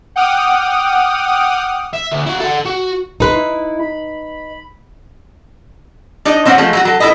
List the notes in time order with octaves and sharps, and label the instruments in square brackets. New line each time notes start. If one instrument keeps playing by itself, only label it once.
[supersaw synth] F#5 G5 D6 D#6 F6
[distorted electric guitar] E5
D2
E4 F#4
A4 F#5
F#4
[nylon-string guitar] D#4 B4 [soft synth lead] C6
[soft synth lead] E4
B5
[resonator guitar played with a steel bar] D4 D#4 D#5
F#3 C4 C#4 D5 F#5
F3 G#3 A3
F#3 G3 F#4
F#3 A4
E4 F4 A4 B4 D#5